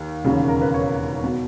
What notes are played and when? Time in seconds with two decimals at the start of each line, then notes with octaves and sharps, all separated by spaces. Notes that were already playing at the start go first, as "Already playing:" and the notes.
Already playing: D#2
0.24 E1 D#2 C#3
0.48 A#4
0.62 B4
0.74 C#5
1.23 B2